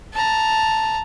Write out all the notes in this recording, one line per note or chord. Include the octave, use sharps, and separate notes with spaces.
A5 A#5